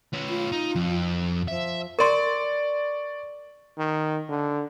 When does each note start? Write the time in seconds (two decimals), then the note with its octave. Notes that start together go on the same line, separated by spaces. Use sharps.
0.13 C#4 B4
0.29 F4
0.52 D#4
0.76 F2
1.48 F3 E5
1.99 A#4 D5 C6 C#6
3.78 D#3
4.29 D3